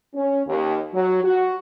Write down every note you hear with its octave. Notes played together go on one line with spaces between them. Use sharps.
C#4
D#2
F#3
F#4